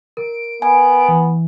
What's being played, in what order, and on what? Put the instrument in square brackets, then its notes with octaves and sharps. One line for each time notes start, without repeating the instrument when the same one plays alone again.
[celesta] A#4 [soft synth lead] D7
[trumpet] B3 [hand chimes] G#5
[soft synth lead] E3